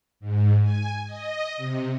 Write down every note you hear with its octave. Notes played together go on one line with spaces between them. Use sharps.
G#2
G#5
D#5
C3